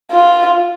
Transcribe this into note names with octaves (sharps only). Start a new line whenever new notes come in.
F4